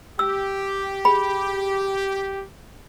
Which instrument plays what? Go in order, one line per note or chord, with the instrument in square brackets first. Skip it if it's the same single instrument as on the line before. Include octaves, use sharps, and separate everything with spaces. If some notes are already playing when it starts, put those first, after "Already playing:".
[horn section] G4 [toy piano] E6
[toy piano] G#4 B5